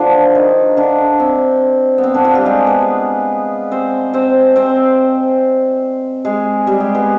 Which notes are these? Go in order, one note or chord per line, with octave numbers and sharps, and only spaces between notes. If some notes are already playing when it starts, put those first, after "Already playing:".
Already playing: D3 F3 D4 F4
D#3 D#4
D3 D4
C4
B3
C4
D3 D4
F3 F4
G3 G4
G#3 G#4
B3 B4
C4 C5
C4 C5
C4 C5
G#3 G#4
G3 G4
G#3 G#4
B3 B4